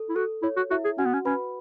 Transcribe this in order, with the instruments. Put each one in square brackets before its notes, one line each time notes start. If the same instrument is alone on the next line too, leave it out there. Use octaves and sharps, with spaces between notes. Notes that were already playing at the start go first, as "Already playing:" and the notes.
Already playing: [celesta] A4
[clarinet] E4
[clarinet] F#4 [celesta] A4
[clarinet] E4 [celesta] C#5
[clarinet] F#4
[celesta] E4 E5 [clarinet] F#4
[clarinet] G#4
[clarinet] C#4 [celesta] F#4 F#5
[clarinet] B3
C#4
[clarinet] C#4 [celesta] B4 B5